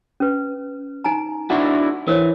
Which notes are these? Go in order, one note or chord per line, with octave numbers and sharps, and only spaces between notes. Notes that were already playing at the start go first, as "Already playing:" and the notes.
C#4 B4
D#4 G#5 A#5
D4 E4 F#4
E3 A#4 C5 C#5